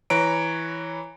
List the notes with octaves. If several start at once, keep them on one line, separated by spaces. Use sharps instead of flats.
E3 B4 C#5 A#5 D7